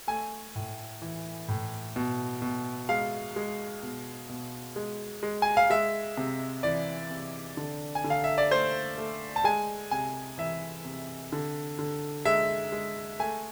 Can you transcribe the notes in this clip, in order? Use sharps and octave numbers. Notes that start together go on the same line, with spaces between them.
A3 G#5
A2
E3
A2
B2
B2
G#3 F5
G#3
B2
B2
G#3
G#3
G#5
F5
G#3 E5
C3
E3 D5
C3
D3
G#5
D3
F5
E5
D5
A3 C5
A3
A5
G#3 G#5
C3 G#5
E3 E5
C3
D3
D3
G#3 E5
G#3
A3 G#5